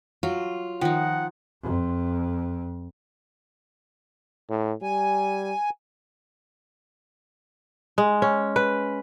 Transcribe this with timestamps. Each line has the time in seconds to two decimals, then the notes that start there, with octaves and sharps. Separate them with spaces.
0.23 F#3 F4
0.81 D#3 F3 D#4 F#5 G5
1.63 F2
4.50 A2
4.82 G3 G#5
7.98 G#3
8.22 C#4
8.56 B4